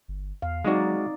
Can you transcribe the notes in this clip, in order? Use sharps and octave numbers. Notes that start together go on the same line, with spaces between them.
G1
E2 F5
F#3 G#3 C4 D#4 F#4 D5